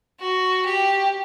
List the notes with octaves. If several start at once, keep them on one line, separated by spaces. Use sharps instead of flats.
F#4
G4